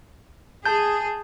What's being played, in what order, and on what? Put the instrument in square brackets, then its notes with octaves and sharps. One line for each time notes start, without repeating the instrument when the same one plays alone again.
[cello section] G#4 [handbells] A5 G6